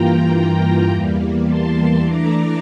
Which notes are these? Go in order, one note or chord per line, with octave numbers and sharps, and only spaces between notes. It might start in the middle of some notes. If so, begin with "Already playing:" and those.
Already playing: G2 E3 A#3 F4 G5 A#5
E2 E3 G3 A#3
A5 C6
E3 A3 D4 A#5 D6